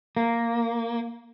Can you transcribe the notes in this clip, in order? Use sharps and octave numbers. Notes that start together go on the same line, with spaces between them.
A#3